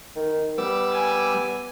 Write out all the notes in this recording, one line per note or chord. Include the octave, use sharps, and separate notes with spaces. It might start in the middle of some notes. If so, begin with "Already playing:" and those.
D#3
G3 B3 D6 E6
G#5